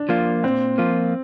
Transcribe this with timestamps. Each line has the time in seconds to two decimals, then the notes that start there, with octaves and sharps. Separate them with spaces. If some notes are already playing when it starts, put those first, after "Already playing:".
Already playing: D4
0.09 F3 A#3 F4
0.43 A#2 C4
0.78 F3 A#3 F4